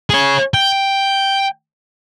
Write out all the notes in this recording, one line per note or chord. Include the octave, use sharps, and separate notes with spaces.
G#4 C#5
G5